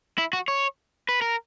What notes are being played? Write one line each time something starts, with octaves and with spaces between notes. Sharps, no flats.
E4
F#4
C#5
B4
A#4